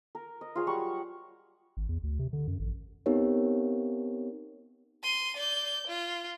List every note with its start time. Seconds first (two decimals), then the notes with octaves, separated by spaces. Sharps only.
0.15 A#4
0.41 D#5
0.55 F4 G#4 C#5
0.67 F#3 G3 F#5 C#6
1.77 G#1
1.89 E2
2.03 D2
2.19 C3
2.33 D3
2.47 F#2
2.60 A1
3.06 B3 C4 D#4 G4 A#4 C#5
5.03 C6 D#7
5.36 D5 G6
5.87 F4